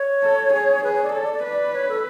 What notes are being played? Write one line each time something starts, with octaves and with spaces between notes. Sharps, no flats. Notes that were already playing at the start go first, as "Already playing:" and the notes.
Already playing: C#5
A4
G#4
G#4 B4
C#5
D5
A4 C#5
D5
D5
B4
D5
C#5
A4